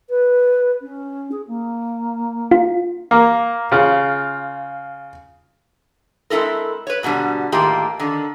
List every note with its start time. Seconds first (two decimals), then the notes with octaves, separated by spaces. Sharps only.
0.09 B4
0.81 C#4
1.31 G#4
1.47 A#3
2.51 F4
3.11 A#3
3.72 C#3 F4
6.30 G#3 C4 C#4 E4 A4 A#4
6.87 B4 C#5
7.03 G#2 B2 D3 G3
7.52 A2 D#3 A#3 F4 G4 G#4
8.00 D3 D#3